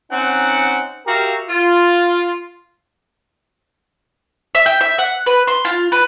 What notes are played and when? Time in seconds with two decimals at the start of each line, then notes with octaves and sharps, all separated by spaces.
0.11 C4 C#4 D#4 F#5
1.07 F#4 G4 A#4 E5 F5
1.49 F4
4.55 E5
4.66 G5
4.81 E5
4.98 F#5
5.26 B4
5.47 C6
5.65 F4
5.92 B4